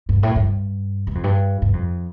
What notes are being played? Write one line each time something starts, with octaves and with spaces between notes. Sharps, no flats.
G2
A2
G2
G2
F2
G2
G2
F2